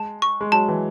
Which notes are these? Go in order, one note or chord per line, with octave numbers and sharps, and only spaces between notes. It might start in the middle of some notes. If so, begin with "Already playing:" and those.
Already playing: G#3 A5
C#6
G#3
F#3 A5
E3